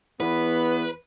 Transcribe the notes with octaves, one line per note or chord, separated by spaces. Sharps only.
E2 B3 B4